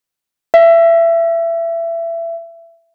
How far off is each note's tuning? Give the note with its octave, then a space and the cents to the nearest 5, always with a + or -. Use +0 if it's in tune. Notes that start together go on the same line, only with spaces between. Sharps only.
E5 +25